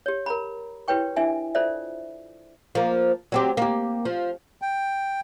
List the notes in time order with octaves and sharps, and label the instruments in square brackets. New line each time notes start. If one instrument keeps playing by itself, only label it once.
[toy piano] G4 C#5
A#4 A#5 B5
E4 G4 B4 C#5 G5 C#6
D4 E4 E5 G#5
F4 A4 C5 D5 E5
[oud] F3 A#3
F#3 C4 G4
A#3 G4
F3
[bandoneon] G5